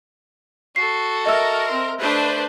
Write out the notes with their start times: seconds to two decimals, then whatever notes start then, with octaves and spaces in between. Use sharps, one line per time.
0.76 F#4 A4 C7
1.26 A#4 D#5 E5 E6
1.67 C4 C6
2.00 A3 D4 B4 C5 D5